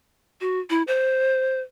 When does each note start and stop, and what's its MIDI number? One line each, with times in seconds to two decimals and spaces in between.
0.41 0.60 66
0.70 0.83 64
0.87 1.60 72